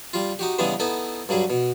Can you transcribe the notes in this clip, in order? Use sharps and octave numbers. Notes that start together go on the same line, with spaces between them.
G3 F4
D#4 F#4 G4
C#3 E3 G3 G#3 B3 D4
B3 D#4 E4 A4
G2 F#3 G3 G#4
B2